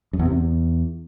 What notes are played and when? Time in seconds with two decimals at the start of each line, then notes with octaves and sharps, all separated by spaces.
0.13 F#2
0.19 E2
0.25 C3
0.32 E2